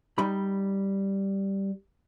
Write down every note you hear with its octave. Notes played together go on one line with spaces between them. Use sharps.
G3 D#4 B5